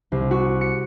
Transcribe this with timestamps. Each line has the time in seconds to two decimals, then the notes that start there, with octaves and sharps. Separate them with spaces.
0.12 C2
0.31 F#4
0.61 C#7